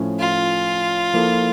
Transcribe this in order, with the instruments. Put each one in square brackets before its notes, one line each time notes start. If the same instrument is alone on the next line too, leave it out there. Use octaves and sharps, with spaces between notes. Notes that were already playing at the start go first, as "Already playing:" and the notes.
Already playing: [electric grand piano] A2 F3 C#4
[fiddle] F4
[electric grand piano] F3 A#3 E4 A4